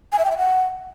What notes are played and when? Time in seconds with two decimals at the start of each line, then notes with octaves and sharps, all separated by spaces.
0.12 G#5
0.19 E5
0.25 G5
0.31 E5
0.37 F#5